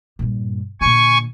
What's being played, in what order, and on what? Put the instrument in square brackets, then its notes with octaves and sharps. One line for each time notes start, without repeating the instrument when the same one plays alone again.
[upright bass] G2 A#2
[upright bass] A#2 D3 [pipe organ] G#5 C#6